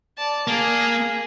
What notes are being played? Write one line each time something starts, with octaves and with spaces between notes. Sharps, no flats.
D5 A5
A#3 G#4